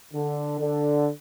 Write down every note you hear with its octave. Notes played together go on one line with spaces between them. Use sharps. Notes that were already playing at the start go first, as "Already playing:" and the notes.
D3
D3